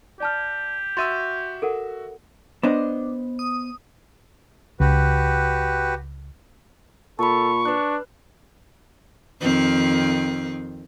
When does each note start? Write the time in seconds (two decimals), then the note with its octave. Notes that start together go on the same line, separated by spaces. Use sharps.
0.20 G4 D5 A5 F6
0.97 F#4 E5 C6 E6 A6 D#7
1.62 A4 A#4 F#5
2.63 B3 D4 C5 D#5
3.39 D#6
4.80 C#2 F#4 G4 B4
7.19 A#2 A4 A5 B5 C#6
7.65 D4 B4 F#6
9.41 F2 D#3 C4